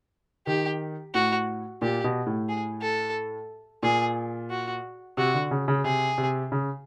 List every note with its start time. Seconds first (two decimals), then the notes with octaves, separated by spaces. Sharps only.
0.47 D#3 G4
1.14 A2 F#4
1.82 A#2 G4
2.04 B2
2.27 A2
2.49 G#4
2.82 A4
3.83 A#2 G#4
4.50 F#4
5.17 C3 F#4
5.34 D3
5.51 C#3
5.68 C#3
5.84 C3 G#4
6.18 C3
6.52 C#3